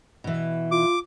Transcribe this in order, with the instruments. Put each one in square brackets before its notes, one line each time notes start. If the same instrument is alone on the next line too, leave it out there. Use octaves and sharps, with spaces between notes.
[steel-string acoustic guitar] B2 E3
[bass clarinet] F4 [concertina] D6